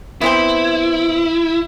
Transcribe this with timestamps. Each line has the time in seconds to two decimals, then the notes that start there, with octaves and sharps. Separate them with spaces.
0.21 B3 C4 E4 G5